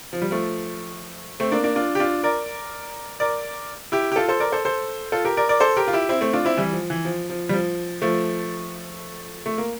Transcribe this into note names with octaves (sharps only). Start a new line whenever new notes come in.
F3
G3
F3 A3
A3 C4
A#3 D4
A#3 D4
D4 F4
G4
D4 F4
A#4 D5
A#4 D5
E4 G4
G4
F4 A4
A4 C5
A#4 D5
A4 C5
A4 C5
F4 A4
G4 A#4
A#4 D5
A#4 D5
A4 C5
G4 A#4
F4
E4 G4
C4 E4
A3 C4
D4 F4
C4 E4
E3 G3
F3
E3
F3
F3
G3
F3
F3 A3
A3
A#3